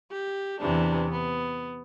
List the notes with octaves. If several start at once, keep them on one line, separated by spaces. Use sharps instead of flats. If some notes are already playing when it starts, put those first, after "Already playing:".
G4
E2 C3 E3 D4
B3